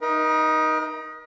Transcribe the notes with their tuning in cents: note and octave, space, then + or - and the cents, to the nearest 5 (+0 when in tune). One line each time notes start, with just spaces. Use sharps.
D#4 +0 A#4 +40 E5 +0